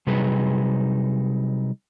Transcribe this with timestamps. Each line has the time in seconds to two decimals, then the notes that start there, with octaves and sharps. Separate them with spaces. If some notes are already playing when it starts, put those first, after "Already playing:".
0.07 C3 F#3 G3 D#4 G#4 B4